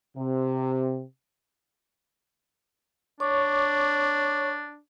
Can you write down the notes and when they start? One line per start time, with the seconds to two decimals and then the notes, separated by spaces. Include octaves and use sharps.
0.17 C3
3.20 D4 C#5 C#6 D6